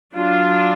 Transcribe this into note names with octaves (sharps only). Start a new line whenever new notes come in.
F#3 D4 F4